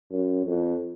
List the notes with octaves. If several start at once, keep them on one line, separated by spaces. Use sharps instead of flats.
F#2
F2